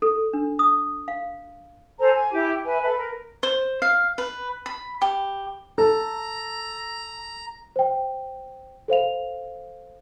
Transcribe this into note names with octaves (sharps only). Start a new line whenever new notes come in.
A4
D4
D#6
F5
A4 C5 G#5 A#5
G#5
E4 G4 D6
B4 E5 G#5
A4 B4
A#4
C5
F5
B4
B5
G4
A4 A#5
C5 G5
A4 C5 F5 F7